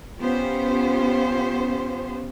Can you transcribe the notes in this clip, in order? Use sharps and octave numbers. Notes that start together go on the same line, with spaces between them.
B3 C#4 F4 G4 C5